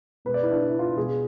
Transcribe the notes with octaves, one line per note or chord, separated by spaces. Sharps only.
B2 G#3 B4
D5
E4
D4
E4
F4
B2 G#3 G#4